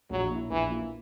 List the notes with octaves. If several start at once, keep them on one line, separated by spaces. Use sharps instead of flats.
A#1 F#3
A#2 A#3 E4
A#1 E3
A#2 A#3 E4